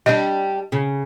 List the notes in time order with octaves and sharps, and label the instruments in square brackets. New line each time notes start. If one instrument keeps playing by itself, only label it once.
[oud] G3 D4 [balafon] D#5
[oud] C#3